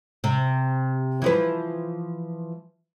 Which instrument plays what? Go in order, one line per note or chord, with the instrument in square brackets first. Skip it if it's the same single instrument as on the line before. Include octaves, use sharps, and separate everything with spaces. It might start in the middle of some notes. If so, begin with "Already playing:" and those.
[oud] C3
E3 F3 B4